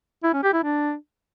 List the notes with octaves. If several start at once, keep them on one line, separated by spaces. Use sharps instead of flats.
E4
C#4
G4
E4
D4